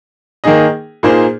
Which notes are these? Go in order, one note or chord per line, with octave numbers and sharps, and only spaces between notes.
D#3 A#3 D#4 G#4 D#5
A#2 A#3 D#4 G#4 C5